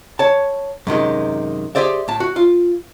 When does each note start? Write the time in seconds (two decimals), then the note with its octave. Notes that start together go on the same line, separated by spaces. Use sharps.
0.19 C#5 A5
0.87 F#2 C3 D#3 G#3
1.75 G4 G#4 C5 D5 E5
2.08 A2 A5
2.20 F#4
2.36 F4